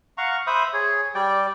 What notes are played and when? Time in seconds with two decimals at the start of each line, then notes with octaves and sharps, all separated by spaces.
0.18 F5 F#5 A#5 C#6
0.47 C5 E5 B5 D#6
0.73 G#4 C#5
1.15 G3 D5 G5